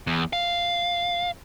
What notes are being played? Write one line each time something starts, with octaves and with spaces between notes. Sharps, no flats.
E2
F5